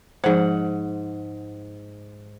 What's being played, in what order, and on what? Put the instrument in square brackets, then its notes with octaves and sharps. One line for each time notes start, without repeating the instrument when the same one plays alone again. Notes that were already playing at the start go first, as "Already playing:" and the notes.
[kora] G#2 F#5 [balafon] F3 C5